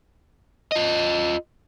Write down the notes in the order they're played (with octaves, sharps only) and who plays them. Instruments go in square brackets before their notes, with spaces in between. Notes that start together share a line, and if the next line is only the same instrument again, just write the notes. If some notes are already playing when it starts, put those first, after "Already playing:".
[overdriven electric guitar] F4 D#5